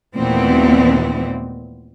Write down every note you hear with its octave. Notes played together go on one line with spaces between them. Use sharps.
D#2 A#2 E3 A3 B3 C4